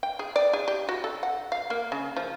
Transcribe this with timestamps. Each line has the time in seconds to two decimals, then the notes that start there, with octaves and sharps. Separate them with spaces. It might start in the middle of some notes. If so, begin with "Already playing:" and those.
0.03 G5
0.19 G#4
0.36 D5
0.53 G#4
0.68 G4
0.89 F#4
1.04 A4
1.23 F#5
1.52 F5
1.70 A#3
1.92 C#3
2.17 F3